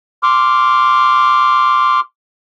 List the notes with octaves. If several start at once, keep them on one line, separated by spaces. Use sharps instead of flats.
C6 D6 F6